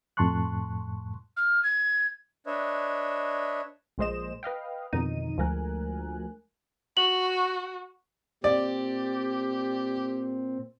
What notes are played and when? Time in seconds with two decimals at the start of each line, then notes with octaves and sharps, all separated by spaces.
0.17 F2 A2 A5 C6 C#6 F#6
1.37 F6
1.63 G#6
2.46 D4 B4 C#5 D#5 E5
3.98 A#1 A#2 G#3 C5 D#5 E7
4.43 B4 D#5 F5 G5
4.93 F2 B2 D3 D#3 D#4 D#7
5.38 D2 F3 G#3 A#4 G#5 F#6
6.97 F#4 F#7
8.44 A#2 C4 G4 D5